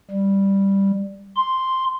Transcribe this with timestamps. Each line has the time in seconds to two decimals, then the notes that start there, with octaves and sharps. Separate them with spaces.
0.11 G3
1.36 C6